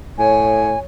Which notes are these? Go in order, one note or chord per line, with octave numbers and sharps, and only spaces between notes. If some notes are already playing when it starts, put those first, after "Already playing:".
A2 C#5 G#5